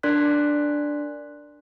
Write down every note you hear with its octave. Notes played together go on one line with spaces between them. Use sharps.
D4 A#4 D5 C6 F#6 B6